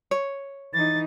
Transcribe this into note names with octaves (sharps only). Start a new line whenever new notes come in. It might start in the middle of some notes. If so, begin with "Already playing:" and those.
C#5
E3 D#4 A6